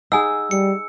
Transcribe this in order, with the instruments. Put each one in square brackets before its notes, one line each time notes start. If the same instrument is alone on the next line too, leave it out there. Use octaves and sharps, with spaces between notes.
[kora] D#4 G#4 [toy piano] F#5 G#5 [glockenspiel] E6
[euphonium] G3 [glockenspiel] C#7